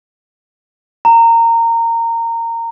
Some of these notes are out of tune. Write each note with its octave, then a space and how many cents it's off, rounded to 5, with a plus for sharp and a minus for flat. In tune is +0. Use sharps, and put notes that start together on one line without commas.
A#5 -20